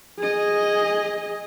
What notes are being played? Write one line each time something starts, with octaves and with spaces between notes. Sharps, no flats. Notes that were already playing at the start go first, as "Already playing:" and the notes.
G#4 D#5